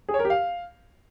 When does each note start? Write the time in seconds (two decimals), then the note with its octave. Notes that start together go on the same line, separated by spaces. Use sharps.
0.09 G#4
0.14 C#5
0.19 A#4
0.25 G4
0.30 F5